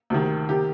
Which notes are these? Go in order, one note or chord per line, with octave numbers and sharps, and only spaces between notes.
D2 C3 D#3
C3 D#3 G4